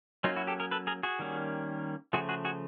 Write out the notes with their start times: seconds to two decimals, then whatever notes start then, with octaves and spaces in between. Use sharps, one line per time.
0.24 F#3 A#3 C#4 D#4 F4
0.36 E4 F#4
0.47 G4 A4
0.60 G#4 A#4
0.71 A4 B4
0.87 G#4 A#4
1.03 F#4 G#4
1.19 D#3 G3 A#3 C#4
2.13 C#3 F3 A3 F#4 G#4
2.29 F#4 G#4
2.45 F#4 G#4